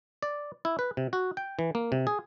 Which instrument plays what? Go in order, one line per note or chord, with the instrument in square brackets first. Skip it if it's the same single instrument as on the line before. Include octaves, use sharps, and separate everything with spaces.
[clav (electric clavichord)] D5
E4
B4
C3
F#4
G5
E3
A#3
C3
G#4